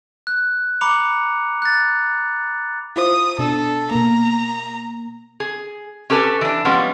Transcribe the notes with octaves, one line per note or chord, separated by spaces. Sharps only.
F#6
A#5 B5 D6 C#7 F7
F#6 A6
E4 F4 C5 D#6
B2 D4 A4
B2 A#3 A#5
G#4
C#4 G4 A4 B4 G#5
E3 D4
F3 G3 G#3 B3 C#4